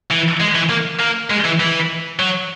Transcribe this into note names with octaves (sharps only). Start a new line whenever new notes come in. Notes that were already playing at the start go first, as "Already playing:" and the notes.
E3
G#3
E3
A#3
A#3
G#3
E3
E3
F#3